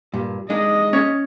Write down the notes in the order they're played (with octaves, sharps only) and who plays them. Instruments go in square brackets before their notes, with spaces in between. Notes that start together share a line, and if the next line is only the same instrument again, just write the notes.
[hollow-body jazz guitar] G2 A#2
[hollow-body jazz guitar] G#3 D4 D#4 [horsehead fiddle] D#5
[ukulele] C#4 C#5